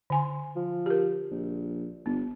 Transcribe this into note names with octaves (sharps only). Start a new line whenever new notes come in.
D3 G#5 C6
F3
G4 A#4
A#1
G1 B3